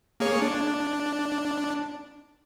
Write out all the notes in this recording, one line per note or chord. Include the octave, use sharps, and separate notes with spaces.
A#3 G#4 C#5
D4